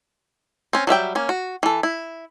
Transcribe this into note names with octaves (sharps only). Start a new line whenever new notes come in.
C4 C#4
F#3 G3 E5 G5
A#3 C#4
F#4
E3 A4
E4